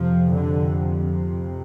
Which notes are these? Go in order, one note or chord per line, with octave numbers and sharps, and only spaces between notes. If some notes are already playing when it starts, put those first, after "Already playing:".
Already playing: F2 C3 F3
D3